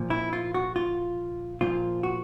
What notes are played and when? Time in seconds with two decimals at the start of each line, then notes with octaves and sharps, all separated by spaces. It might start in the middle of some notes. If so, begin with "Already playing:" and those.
Already playing: A#2 F3
0.10 E4
0.33 F4
0.54 F#4
0.76 F4
1.61 A#2 F3 F4
2.03 F#4